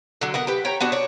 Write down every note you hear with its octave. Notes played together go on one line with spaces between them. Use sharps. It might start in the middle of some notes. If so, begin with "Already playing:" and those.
D3 F#3
B3 A#4 F#5
G4 B4
C#5 G5 A#5
B3 D4 F#4
D4 C#5